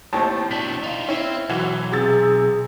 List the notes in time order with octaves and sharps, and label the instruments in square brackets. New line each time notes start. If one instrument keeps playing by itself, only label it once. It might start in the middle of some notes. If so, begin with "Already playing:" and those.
[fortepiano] D#2 A2 C4 [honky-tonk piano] A5
[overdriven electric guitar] B2 D4 [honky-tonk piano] B6
[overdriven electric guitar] D#4 F4
[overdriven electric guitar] C4 [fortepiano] C#4 E4
[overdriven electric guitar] B1 [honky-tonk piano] E3 [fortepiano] F#4
[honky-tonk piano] C3 E6 A6 [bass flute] G#4